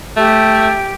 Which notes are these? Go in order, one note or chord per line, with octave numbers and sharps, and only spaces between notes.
A3 G4